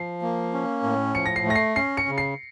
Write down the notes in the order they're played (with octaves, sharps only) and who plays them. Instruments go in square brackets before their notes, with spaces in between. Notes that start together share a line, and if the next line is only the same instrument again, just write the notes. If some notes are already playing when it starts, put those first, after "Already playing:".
Already playing: [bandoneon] F3 [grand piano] C7
[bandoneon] A#3
C#4
A2
[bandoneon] F3 [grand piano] C#7
[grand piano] A#6
C7
[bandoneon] A3
[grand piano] A#6
C7
[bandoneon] C#4 [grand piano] C7
[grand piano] C#7
[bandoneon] C#3
[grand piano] C7